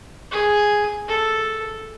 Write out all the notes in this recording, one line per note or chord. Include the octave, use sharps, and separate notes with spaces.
G#4
A4